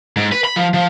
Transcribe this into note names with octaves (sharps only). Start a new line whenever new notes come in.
G#2
B4
B5
F3
F3